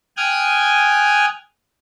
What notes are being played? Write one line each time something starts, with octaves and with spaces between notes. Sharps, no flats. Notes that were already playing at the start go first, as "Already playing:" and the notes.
G5 G#5 D#6 F6 F#6 G#6